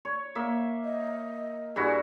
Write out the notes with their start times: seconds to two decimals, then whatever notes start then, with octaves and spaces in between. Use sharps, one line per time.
0.05 C#5
0.35 A#3 E5
0.84 D#5
1.76 G2 E4 F#4 G#4